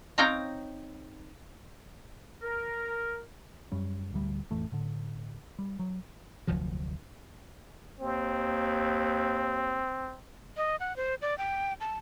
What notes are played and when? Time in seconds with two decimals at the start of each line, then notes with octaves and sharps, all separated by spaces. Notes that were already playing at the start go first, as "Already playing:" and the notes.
0.18 C4 D#4 C#5 F5 G5 A#5
2.43 A#4
3.72 F#2 G3 C#4
4.13 D1 D2 G3
4.51 A1 F2 E3 A3
4.72 A2 D3
5.59 G3
5.79 F#3
6.47 F1 D2 F3 F#3
8.00 D#2 C4
10.57 D#5
10.80 F#5
10.97 C5
11.22 D5
11.38 G5
11.81 A5